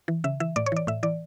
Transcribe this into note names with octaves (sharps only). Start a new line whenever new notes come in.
E3
C#3 E5
E3 E5
A2 D5
C#5
E3 D5
A2 E5
E3 D5